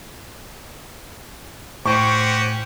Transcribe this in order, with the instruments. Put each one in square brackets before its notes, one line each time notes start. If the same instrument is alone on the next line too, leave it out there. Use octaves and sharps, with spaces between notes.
[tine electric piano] A2 G5 [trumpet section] C#4 F#4 G4 [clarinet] C5 [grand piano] C#6